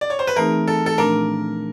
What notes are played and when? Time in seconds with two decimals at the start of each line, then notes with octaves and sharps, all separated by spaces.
0.01 D5
0.10 C#5
0.19 C5
0.27 B4
0.36 E3 A3 C4 D#4 G#4 A#4
0.68 A4
0.86 A4
0.98 A#2 F3 A3 D4 A#4